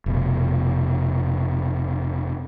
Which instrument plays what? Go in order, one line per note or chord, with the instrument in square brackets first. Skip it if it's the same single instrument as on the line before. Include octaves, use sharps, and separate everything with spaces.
[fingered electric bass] F1 B2